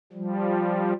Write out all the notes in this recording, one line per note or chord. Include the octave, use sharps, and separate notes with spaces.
F3 G3